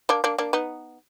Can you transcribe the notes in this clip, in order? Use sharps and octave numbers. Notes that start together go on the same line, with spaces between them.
A#3 D4
A#3 D4
A#3 D4
B3 D#4